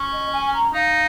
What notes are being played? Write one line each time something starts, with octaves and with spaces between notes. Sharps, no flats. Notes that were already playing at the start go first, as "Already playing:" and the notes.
Already playing: C#4
D#5
G#5
A#5
D#4 F5